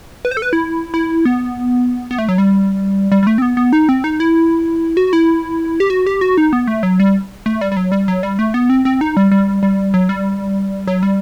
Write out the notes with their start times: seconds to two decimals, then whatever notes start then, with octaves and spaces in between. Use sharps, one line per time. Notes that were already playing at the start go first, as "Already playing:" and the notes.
0.25 B4
0.31 C5
0.37 A4
0.42 B4
0.53 E4
0.94 E4
1.25 B3
2.11 B3
2.18 A3
2.29 F#3
2.38 G3
3.12 G3
3.23 G3
3.27 A3
3.38 C4
3.42 B3
3.57 B3
3.73 D#4
3.89 C4
4.04 D#4
4.20 E4
4.97 F#4
5.13 E4
5.80 G4
5.90 F#4
6.07 G4
6.21 F#4
6.37 D#4
6.53 B3
6.67 A3
6.83 F#3
7.00 G3
7.46 A3
7.61 G3
7.72 G3
7.77 F#3
7.92 G3
8.08 F#3
8.23 G3
8.39 A3
8.54 B3
8.70 C4
8.85 C4
9.01 D#4
9.17 G3
9.32 G3
9.63 G3
9.94 F#3
10.09 G3
10.87 F#3
11.03 G3